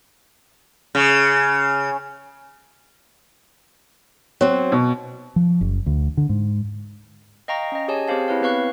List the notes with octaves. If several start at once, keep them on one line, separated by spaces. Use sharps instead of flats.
C#3
F#3 C4
B2
F3
F#1
D2
D3
G#2
D#5 F5 G5 A#5 C#6 A#6
C#4 D#5
G4 G#4 C#5 G#5 A5
C4 G4 G#4 C5 F5 A5
C4 E4 B4 C#5 F5
B3 C4 B4 F5 C#6 F#6